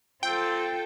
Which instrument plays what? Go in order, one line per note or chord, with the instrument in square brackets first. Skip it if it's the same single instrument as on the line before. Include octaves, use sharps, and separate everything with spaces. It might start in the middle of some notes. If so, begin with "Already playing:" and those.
[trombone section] C4 [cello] F4 A4 [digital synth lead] G5